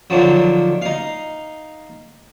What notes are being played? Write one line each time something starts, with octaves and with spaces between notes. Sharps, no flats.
D3 D#3 F3 F#3
D#4 F5